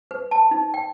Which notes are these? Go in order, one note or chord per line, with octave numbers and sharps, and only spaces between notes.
B4
A5
D#4
G5